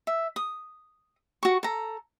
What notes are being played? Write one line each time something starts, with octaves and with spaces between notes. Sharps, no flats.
E5
D#6
F#4 C#6
A4 A#5